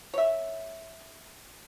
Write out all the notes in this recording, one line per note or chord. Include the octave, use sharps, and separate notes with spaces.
C#5 E5